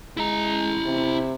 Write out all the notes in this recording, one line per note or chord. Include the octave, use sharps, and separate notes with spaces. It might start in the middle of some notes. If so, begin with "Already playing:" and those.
G#3 E4 A#5
C3